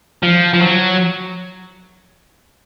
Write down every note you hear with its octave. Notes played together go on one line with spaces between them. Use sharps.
F3
F3
F#3